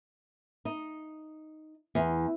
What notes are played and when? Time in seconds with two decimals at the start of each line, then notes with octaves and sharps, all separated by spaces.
0.65 D#4
1.95 E2